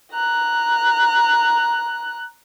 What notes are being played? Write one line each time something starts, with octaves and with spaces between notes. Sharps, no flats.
A#5 F#6